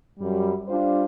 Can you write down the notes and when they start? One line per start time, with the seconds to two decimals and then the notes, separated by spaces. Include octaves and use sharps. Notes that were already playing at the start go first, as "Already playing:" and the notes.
0.19 F#2 G3
0.68 G3 D4 F4 C5